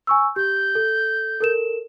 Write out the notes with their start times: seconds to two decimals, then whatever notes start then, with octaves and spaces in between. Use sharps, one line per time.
0.07 G#5 C#6 E6
0.36 G4 G6
0.75 A4
1.41 A4 A#4 E7